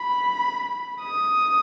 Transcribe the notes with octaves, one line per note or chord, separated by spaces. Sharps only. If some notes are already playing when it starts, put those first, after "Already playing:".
Already playing: B5
D#6